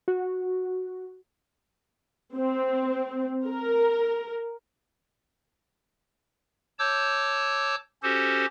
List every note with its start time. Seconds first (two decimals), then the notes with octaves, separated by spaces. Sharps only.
0.08 F#4
2.35 C4
3.45 A#4
6.79 C#5 A5 D6 E6 G6
8.03 C#4 F#4 G4 A4 C5